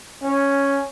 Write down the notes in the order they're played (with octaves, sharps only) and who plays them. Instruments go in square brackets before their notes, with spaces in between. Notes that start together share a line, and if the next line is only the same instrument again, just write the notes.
[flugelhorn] C#4